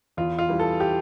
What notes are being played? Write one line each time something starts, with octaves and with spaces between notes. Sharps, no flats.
E2 F4
F4
E3 G3
A4
G4